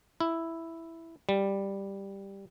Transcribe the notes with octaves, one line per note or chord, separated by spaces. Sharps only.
E4
G3